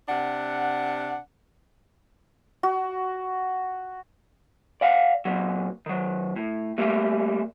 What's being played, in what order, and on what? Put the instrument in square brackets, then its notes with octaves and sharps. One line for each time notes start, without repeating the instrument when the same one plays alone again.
[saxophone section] C3 D4 F#5
[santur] F#4
[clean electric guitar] D5 F5 F#5
A#2 F#3
D#3 F#3
A2
G3 A3 A#3